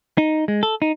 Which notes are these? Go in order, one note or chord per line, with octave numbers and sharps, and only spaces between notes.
D#4
G#3
A4
D#4